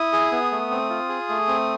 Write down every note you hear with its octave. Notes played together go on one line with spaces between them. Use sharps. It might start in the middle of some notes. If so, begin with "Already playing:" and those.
Already playing: E4 D#6
G#4
B3
A3
C4
F4
G#4
A3
C4